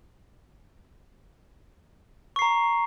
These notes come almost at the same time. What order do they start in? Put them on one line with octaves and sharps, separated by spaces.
C#6 C7 A#5